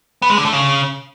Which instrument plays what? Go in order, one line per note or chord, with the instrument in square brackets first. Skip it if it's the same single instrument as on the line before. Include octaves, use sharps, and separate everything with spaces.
[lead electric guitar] B3
G#3
D3
A3
C#3